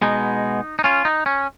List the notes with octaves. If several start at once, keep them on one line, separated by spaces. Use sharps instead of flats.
B2 G#3 B3 D#4
D#4
C#4 F4
D#4
C#4